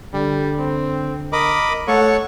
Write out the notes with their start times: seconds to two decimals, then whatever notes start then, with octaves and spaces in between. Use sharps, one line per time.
0.14 D3 G3
0.59 C4
1.33 A#4 D#5 B5 D6
1.88 A3 A4 C#5 F#5 C#6